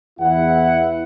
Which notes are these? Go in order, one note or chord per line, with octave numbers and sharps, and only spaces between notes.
E2 E4 F#5